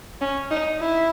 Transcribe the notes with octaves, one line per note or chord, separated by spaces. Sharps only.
C#4
D#4
E4